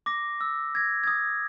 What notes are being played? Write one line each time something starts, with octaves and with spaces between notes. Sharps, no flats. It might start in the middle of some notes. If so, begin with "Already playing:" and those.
D6 A#6
E6
G#6 A#6
D#6 G#6